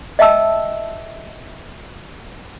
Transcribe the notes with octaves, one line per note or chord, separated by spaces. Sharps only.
D#5 E5 G5 A5 E6